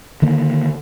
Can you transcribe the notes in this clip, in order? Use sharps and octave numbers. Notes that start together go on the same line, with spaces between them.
D3 D#3 A#3